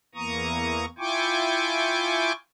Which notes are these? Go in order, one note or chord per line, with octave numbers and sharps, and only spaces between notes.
E2 E3 A#3 A#5 C#6 D#6
E4 F4 G5 G#5 C#6 D6